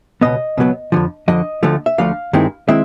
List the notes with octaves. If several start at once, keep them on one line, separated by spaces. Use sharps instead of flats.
C#2 B2 F#3 B3 D#5
C#2 B2 F#3 B3
F2 D3 F3
F2 D3 F3 D#5
D2 D3 F3 A3
E5
D2 D3 F3 A3 F5
G2 D#3 G#3 C4 E4
D#3 G#3 C4 E4 E5